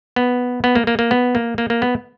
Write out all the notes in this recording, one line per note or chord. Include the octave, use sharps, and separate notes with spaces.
B3
B3
A#3
A#3
A#3
B3
A#3
A#3
A#3
B3